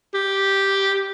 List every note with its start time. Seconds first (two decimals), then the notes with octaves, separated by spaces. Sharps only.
0.14 G4